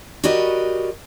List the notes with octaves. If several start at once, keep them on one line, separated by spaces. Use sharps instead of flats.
F#4 G4 A#4 B4 D5 D#5